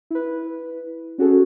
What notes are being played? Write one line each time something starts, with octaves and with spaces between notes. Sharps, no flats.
E4 B4
C#4 F#4 G#4 A4